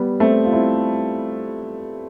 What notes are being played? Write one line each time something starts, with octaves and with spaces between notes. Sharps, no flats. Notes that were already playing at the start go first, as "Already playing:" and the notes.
Already playing: G3 B3
A3 C4
F4
C4 E4